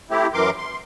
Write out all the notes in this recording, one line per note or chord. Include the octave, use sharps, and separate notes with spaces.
A3 C4 E4 G4
F#2 E3 A#4 C6 D6
C6